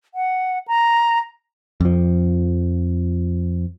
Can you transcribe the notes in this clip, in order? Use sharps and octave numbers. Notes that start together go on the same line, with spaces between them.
F#5
A#5
F2 F3